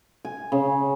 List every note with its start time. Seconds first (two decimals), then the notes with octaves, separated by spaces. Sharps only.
0.25 G#5
0.52 C#3